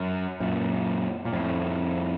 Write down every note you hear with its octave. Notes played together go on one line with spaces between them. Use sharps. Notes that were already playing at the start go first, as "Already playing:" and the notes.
Already playing: F#2
F#2 A#2
A#2
F2 A2